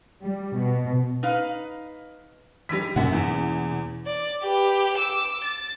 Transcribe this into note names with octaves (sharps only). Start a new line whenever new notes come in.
G3
B2
D#4 B4 F5
E3 G3 D#4 B6
F#2 B2 A#3 C#4 E5 F#5
E2
D5
G4 B4
D6 E6
A6